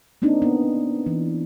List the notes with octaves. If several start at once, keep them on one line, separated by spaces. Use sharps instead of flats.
A#3 C4 D4 D#4
B3
E3